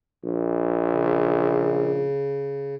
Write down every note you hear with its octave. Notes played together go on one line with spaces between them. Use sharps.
A#1
C#3